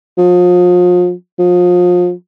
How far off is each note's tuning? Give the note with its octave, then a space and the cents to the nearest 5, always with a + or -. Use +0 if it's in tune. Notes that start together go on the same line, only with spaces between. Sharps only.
F3 +35
F3 +30